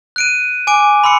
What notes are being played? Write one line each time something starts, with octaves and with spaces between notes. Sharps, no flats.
F#6 D7 D#7
G#5 D6 D7
B5 C6 E6 C#7